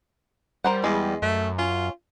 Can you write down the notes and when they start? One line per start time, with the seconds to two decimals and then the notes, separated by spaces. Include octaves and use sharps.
0.64 G3 A#4 C5 F#5
0.84 E2 G#3
1.22 F#2 A3
1.59 C#4 F4